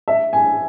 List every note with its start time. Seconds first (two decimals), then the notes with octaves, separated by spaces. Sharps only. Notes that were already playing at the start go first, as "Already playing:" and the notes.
0.08 E5
0.33 G#5